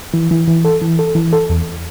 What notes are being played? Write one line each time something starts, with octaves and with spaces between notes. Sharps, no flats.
E3
E3
E3
A4
E3
A4
E3
A4
E2